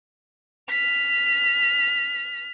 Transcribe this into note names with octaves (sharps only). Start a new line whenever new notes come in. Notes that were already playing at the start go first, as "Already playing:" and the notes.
F6 B6